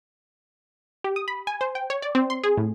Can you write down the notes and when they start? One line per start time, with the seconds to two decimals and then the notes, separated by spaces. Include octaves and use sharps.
1.04 G4
1.16 D#6
1.28 B5
1.47 G#5
1.61 C5
1.75 G5
1.90 C#5
2.02 D5
2.15 C4
2.30 C6
2.44 G#4
2.57 A2